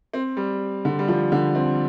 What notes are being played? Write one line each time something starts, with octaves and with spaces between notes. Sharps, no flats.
C4
G3
D3
G3
F3
D3
C4